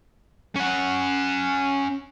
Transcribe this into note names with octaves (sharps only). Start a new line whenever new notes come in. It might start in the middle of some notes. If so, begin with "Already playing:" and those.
C#4 F#5